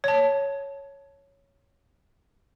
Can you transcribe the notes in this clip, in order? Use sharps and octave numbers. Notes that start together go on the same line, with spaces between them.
C#5 A5